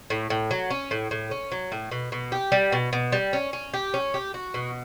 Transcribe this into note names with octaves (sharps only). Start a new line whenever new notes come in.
A2
A2
F#3
C#4
A2
A2
C#4
F#3
A2
B2
B2
G4
G3
B2
B2
G3
C#4
C#4
G4
C#4
G4
F#4
B2